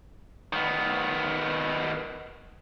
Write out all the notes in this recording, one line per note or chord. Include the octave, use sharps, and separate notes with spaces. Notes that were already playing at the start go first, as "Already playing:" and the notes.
D#3 B3